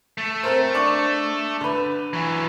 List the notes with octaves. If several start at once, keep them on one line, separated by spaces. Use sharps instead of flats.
A3
C4 A#4 C5
D4 D5 C#6
D3 B4
E3 F#3